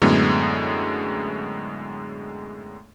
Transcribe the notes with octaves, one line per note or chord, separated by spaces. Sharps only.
F#2 A2 D3 G#3 B3